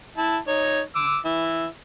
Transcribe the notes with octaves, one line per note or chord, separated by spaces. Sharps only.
E4 A5
D#4 C#5
D6 E6
E3 E5